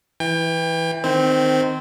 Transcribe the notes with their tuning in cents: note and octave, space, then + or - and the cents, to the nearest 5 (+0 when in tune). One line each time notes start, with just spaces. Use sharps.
E3 +0 G5 +30
D#3 -10 C4 -10